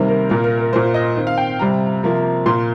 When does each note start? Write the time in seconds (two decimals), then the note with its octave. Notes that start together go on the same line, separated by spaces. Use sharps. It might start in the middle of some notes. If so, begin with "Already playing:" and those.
Already playing: C3 D#3 G3 A#3 C5
0.08 A#4
0.29 A#2 A#3 A#4
0.44 A#4
0.59 A#4
0.73 A#2 A#3 C5
0.94 D#5
1.16 D#3 C4
1.27 F5
1.37 G5
1.59 C3 G3 C4 A#5
2.03 C3 F3 A#3
2.46 A#2 A#3 C6